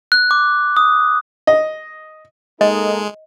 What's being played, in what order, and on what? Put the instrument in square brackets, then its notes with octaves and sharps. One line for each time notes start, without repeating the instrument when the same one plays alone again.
[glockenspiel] F#6
D6
D#6
[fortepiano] D#5
[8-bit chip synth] G#3 [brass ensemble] A#3 D#4 A4 [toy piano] D#5